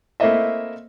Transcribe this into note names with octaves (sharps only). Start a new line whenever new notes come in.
A3 A#3 C4 E4 D#5 E5